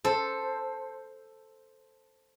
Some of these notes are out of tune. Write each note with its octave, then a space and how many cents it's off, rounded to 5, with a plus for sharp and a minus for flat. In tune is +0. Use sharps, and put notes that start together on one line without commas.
A4 +0 C5 +0